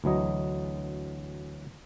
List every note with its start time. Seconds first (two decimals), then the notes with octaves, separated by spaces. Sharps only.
0.04 D2 E3 F#3 D#5